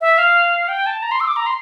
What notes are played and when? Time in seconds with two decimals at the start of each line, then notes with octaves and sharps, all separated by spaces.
0.01 E5
0.18 F5
0.68 G5
0.86 A5
1.03 A#5
1.11 C6
1.20 E6
1.28 D6
1.36 A#5
1.46 C6